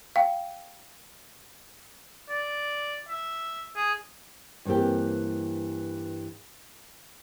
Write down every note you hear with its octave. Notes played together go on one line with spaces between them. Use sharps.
F5 G5
D5
E5
G#4
G2 E3 A#3 C4 G4